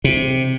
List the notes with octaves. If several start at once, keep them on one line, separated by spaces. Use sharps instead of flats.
C3